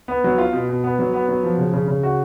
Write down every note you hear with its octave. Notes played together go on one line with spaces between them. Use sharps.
B3
F#3
F4
B2
B2
B3
F#3
B3
F#3
F3
C#3
C#3
C#3
F#4